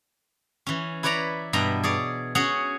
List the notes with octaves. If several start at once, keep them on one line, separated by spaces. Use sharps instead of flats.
E3 C#4
E4 B4 C#5 D5 A#5
G2 B2 E5 A#5
G#4 C#5 D5
C#4 F#4 G#4 F#5